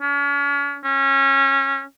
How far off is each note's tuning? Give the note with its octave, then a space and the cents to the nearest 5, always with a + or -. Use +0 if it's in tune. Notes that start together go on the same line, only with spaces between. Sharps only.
C#4 +40
C#4 -20